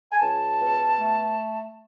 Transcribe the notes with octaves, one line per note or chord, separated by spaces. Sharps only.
G#5
C#2 A5
B2
A3